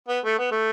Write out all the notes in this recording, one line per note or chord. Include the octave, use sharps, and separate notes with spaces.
B3
A3
B3
A3